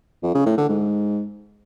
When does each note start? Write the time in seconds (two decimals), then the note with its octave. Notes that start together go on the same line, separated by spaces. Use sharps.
0.23 F2
0.34 C#3
0.46 A2
0.58 D3
0.69 G#2